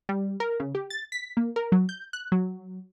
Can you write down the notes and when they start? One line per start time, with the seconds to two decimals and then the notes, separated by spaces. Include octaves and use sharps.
0.09 G3
0.40 A#4
0.60 C#3
0.75 G4
0.90 A6
1.12 B6
1.37 A#3
1.56 A#4
1.72 F#3
1.89 G6
2.13 F#6
2.32 F#3